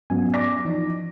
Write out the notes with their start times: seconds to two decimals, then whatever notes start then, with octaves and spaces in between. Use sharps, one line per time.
0.10 F#3 B3 C#4 G#5
0.34 D5 D6 A#6
0.65 E3 F3 D#4